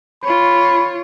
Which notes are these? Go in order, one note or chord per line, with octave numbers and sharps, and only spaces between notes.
F4 C#5 B5